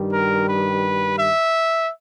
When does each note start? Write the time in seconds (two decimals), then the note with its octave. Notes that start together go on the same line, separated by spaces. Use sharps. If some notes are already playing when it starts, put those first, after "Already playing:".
Already playing: G2 D#3 G3
0.13 A#4
0.48 B4
1.17 E5